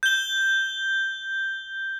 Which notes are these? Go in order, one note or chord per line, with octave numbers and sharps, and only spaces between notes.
G6 G7